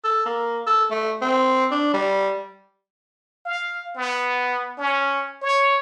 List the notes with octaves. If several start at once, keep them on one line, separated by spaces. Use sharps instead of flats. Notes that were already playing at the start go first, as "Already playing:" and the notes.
A4
A#3
A4
A3
C4
D4
G3
F5
B3
C#4
C#5